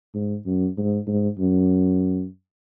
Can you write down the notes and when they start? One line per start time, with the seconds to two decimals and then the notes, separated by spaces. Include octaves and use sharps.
0.15 G#2
0.46 F#2
0.77 G#2
1.07 G#2
1.39 F#2